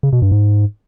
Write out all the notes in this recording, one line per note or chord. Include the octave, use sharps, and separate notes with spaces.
C#3
B2
G2
G#2